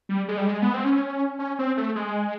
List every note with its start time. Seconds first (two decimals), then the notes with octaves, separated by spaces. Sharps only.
0.09 G3
0.28 G#3
0.37 G3
0.47 G#3
0.62 B3
0.74 C4
0.84 C#4
1.39 C#4
1.59 C4
1.77 A3
1.96 G#3